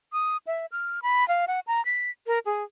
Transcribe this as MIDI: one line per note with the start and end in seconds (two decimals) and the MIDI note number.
0.13 0.37 87
0.47 0.66 76
0.72 1.00 89
1.03 1.27 83
1.28 1.45 77
1.48 1.60 78
1.67 1.84 82
1.85 2.10 95
2.27 2.39 70
2.46 2.63 68